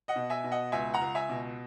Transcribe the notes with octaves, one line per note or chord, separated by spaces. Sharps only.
D#5 F#5
B2
E5 G#5
B2
D#5 F#5
C#2 E5 G#5
F#5 A#5
C#2
E5 G#5
B2